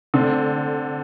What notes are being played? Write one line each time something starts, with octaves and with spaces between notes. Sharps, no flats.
D3 A3 C4